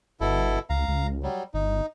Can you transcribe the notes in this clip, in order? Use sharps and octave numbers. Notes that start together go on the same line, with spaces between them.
G1 B2 E4 A4
C#2 F5 A#5
C#2
F#3 G3
G1 D#4